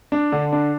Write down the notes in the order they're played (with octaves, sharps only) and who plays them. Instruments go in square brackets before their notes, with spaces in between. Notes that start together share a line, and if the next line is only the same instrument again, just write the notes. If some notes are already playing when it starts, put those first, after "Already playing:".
[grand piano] D4
D3
D4